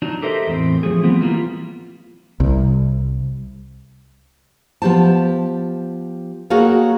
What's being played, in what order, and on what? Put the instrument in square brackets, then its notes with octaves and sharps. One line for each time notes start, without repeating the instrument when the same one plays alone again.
[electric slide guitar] F#3 D4 D#4
G4 A4 A#4 C5 D#5 E5
E2 A2 C4
F3 A3 G#4
F3 G3 B3 C4
E3 G3 A#3 B3 D#4 F4
[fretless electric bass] C2
[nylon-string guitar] F3 B3 G4 C5 A5
A#3 F#4 G#4 A4 C#5 F5